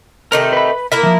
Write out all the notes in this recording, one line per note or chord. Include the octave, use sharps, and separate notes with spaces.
C3 D#3 A3 A#4
B4 B5
A#3 E4 A#4 E5
E3 F3